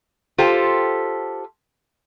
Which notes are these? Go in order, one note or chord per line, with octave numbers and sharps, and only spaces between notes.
F4 G4 A4 C5